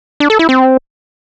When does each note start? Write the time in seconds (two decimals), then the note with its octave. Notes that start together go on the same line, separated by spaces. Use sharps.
0.20 D4
0.30 A4
0.39 E4
0.49 C4